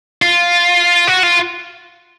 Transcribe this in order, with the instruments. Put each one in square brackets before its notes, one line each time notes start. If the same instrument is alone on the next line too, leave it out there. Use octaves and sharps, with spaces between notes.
[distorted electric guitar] F4
F#4
F4